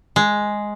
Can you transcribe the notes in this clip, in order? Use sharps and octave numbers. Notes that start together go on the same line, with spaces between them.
G#3